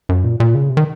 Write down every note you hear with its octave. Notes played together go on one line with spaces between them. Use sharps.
F#2
A#2
A#2
C#3
C3
D#3